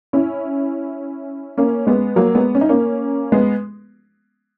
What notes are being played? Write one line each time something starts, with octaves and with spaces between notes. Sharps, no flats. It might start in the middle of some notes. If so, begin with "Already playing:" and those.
C#4 E4
A#3 C#4
G#3 B3
F#3 A#3
G#3 B3
C#4
D#4
A#3 C#4
G#3 B3